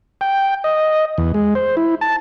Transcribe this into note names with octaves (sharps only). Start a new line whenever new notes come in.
G5
D#5
E2
G#3
C5
E4
A5